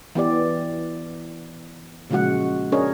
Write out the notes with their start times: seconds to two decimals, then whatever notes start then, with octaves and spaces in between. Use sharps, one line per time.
0.15 E3 B3 G4 D5
2.10 A#2 C#3 F3 G#3 F#4 F#5
2.72 C#4 D4 G#4 A#4 C#5 D#5